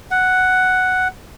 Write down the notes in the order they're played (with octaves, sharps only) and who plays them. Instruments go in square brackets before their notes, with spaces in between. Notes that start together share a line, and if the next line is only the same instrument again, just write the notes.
[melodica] F#5